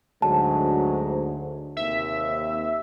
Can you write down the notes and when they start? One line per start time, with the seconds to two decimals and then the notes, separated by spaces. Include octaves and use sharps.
0.22 D2 G#2 D3 F#3 A5
1.77 D#2 C3 E5